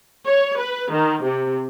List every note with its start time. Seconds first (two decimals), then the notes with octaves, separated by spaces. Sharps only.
0.25 C#5
0.59 B4
0.90 D#3
1.22 C3